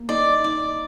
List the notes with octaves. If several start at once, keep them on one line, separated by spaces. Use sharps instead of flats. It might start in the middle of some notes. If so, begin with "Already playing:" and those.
Already playing: A#3
D#4 D5
D#4 D5